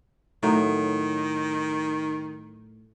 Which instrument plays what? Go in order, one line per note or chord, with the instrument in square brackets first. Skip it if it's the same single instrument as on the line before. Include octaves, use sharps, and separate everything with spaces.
[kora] A2 F#3 [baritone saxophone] D#3